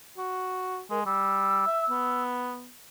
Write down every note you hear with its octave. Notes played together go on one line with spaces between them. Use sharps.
F#4
G#3 A#4
G3 E6
E5
B3